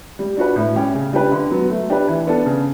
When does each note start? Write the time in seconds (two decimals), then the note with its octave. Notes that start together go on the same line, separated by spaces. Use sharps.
0.19 G3
0.37 D4 F#4 B4
0.56 A2
0.75 G3 C#4 G4
0.95 C#3
1.13 G3 D4 G4 B4
1.32 D3
1.51 F#3 B3
1.70 A3
1.90 D4 G4 B4
2.08 E3
2.27 B3 D4 A4
2.46 C#3